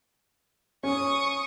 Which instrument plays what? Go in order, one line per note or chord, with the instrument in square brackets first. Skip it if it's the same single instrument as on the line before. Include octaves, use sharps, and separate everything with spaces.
[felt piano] C#4 [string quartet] C#6 D#6